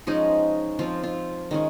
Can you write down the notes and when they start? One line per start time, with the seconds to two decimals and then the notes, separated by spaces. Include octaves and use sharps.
0.07 F3 G#3 C#4 D#4
0.79 F3 C4 F4
1.03 F4
1.51 D#3 G#3 C#4